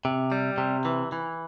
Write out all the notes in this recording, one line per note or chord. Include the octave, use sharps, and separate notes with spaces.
C3
G3
C3
E3
E3